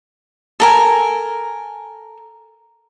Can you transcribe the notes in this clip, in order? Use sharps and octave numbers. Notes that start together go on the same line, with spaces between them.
A4 A#4 G#5